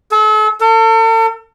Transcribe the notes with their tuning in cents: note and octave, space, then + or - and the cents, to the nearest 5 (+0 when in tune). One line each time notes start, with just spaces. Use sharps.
A4 -40
A4 +40